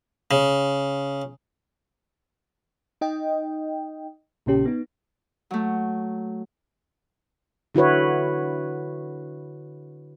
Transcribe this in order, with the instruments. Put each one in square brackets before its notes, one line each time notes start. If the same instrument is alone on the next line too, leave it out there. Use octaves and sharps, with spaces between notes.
[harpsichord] C#3
[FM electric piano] D#4 D#5 G5
A#1 A#2 C#3 C#4 G4
B3 D#4
[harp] F#3 A3
[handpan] D3 E4 F#4 B4 C#5